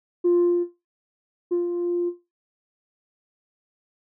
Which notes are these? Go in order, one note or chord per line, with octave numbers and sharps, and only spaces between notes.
F4
F4